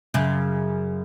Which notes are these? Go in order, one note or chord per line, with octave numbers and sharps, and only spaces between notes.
F#2 C#3